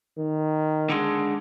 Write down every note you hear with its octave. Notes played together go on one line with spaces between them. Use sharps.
D#3
D3 G#3